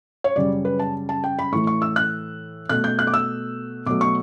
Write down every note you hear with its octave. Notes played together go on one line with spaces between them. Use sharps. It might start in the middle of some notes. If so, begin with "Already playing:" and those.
C#5
F#2 C#3 G3 D5
B4
A5
A5
G5
B5
A2 E3 A3 C#6
C#6
E6
F#6
B2 A3 F#6
G6
F#6
D6
E6
B2 F#3 A3 D6
C#6